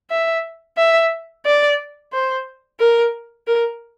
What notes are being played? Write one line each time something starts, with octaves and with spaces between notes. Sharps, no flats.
E5
E5
D5
C5
A#4
A#4